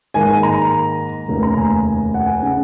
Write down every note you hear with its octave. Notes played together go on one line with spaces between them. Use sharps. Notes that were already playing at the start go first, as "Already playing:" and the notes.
G#2 D#3 A#3 G#5
A#5
F1 D#2 C#3
A#5
G#5
F#5
G#5
C#3 F#5